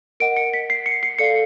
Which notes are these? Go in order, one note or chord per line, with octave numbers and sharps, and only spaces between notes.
A#4 D#5 F#5 D7
C#7
B6
C7
C#7
C7
A4 D5 F5 C#7